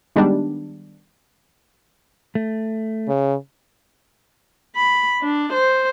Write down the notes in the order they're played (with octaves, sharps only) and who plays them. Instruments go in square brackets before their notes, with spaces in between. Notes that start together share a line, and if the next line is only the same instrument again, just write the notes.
[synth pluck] D#3 G3 G#3 B3 D4
[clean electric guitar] A3
[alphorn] C#3
[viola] B5
D4
C5